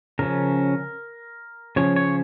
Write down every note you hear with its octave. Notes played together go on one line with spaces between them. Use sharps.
C#3 F3 C#4 A#4
C#3 F3 C#4 C#5
C#5